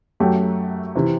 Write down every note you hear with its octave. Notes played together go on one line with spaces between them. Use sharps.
F#2 F#3 A3 G4
C3 E3